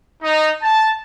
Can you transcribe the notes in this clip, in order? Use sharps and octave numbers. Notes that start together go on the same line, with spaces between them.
D#4
A5